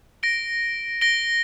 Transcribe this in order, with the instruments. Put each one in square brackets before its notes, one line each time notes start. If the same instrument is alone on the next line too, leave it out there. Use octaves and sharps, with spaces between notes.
[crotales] A#6 D7 G7
A#6 D7 G7